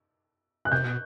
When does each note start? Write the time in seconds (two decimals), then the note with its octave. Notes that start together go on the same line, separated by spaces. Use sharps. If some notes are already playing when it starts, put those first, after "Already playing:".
0.65 F#6
0.72 C3 G6
0.84 B2